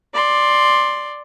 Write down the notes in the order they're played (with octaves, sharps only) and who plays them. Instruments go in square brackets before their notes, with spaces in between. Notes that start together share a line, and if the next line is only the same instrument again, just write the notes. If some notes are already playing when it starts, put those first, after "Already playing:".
[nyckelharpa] D5 C6